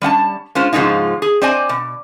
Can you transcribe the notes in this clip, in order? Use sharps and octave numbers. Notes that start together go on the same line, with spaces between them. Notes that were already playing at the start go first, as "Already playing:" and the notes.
G3 C#4 F#5 A5
G#3 C#4 F4 C5
G#2 C#3 F3 G#3 D#4 F4
G#4
C4 C5 D5 D#5 G#5
B2